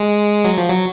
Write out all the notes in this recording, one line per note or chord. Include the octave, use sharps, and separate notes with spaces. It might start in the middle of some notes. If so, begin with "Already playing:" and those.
Already playing: G#3
F#3
F3
F#3